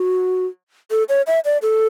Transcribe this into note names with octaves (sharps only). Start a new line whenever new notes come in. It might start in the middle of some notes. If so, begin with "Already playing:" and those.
Already playing: F#4
A4
C#5
E5
D5
A4